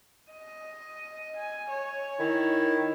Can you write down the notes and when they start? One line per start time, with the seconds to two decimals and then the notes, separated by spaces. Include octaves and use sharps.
0.31 D#5
1.36 G#5
1.70 C#5
2.19 D#3 E4